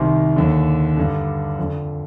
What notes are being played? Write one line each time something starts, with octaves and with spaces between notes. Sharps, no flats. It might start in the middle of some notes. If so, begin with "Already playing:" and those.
Already playing: C2 C3 D#3 C6
D#2 D3
G2 D3
F2 D3